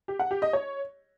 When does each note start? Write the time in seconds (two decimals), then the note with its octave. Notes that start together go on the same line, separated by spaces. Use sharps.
0.08 G4
0.19 F#5
0.31 G4
0.42 D#5
0.53 C#5